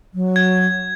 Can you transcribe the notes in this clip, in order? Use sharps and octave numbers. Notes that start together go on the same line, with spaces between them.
F#3
G#6